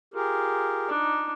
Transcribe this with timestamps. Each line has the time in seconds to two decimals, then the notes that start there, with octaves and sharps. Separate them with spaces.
0.14 F4 G4 G#4 A#4
0.88 D4 D#4